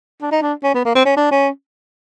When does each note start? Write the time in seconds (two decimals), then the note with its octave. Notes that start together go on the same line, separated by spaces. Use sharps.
0.21 D4
0.31 D#4
0.42 D4
0.63 C#4
0.74 B3
0.85 A#3
0.95 C4
1.05 C#4
1.16 D4
1.31 C#4